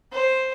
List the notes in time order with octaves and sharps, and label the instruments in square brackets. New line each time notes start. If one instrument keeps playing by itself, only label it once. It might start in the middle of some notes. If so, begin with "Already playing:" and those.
[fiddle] C5